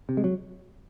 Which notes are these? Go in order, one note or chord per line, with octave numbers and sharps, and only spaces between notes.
C3
G#3
F#3